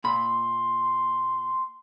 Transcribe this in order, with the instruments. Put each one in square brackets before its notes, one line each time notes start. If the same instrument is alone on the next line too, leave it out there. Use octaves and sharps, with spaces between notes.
[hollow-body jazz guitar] A#2 B5 [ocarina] C6